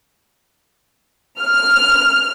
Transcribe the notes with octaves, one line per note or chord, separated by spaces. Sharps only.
F6